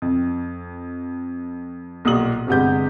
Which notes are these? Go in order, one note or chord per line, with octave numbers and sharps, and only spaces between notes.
F2
B1 A#2 G3 D#6 F#7
G1 C3 G#3 B3 G4 G6